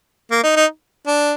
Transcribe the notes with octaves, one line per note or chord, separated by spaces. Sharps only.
A#3
D#4
D#4
D4